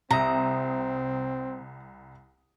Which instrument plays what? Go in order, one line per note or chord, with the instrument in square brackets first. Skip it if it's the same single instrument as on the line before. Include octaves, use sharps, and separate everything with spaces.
[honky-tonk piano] C2 D#6 [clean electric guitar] C3 E5 [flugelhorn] C4 [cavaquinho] A#5